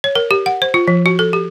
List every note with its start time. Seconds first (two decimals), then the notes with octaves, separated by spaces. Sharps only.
0.04 C#5
0.15 A#4
0.31 G4
0.46 F#5
0.62 C5
0.74 F4
0.88 F3
1.06 F#4
1.19 A4
1.33 G4